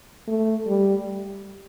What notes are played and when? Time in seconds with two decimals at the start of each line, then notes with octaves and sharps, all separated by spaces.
0.28 A3
0.67 G3